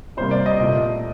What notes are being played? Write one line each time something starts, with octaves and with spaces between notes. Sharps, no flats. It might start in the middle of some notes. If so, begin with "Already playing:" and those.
C3 G3 A#3 C5
D5
D#5
A#2 A3 D#5